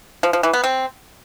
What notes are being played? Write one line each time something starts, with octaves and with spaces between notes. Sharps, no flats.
F3
F3
E3
B3
C4